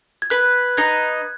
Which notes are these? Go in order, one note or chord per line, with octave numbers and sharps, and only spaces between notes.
G#6
B4 F#6
D#4 G#6